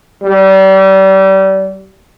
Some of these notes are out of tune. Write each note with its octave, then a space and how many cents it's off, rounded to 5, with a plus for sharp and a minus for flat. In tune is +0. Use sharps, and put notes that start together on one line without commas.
G3 -30